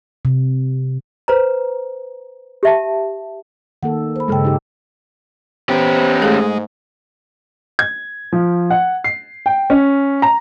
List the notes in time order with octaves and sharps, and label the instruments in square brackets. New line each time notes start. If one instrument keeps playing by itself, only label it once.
[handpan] C3
[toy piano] B4 C5 A#5
G4 E5 A5
[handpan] D#3 A#3 A4 [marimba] F#5
[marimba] C5 B5
[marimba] G2 C#3 G5 [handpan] G#3 A4
[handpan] D#4 G4
[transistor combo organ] B3 [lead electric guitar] C#4 G4 [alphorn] C5
[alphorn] G#2 [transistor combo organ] G#3 [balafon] A3 G#4 A4
[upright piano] G#6
F3
F#5
C7
G5
C#4
A#5